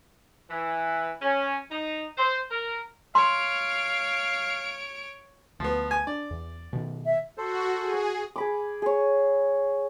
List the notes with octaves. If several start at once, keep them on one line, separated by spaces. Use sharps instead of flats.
E3
C#4
D#4
C5
A#4
C#5 F5 C6 D7
D2 F3 B3
G#5
D4 D5
E2
B2 D#3
E5
F#4 A4 C5
G#4
G#4 B5 D6
G#4 C#5